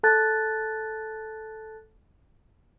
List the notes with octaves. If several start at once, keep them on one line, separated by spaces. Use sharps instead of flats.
A4 A5 F#6 A6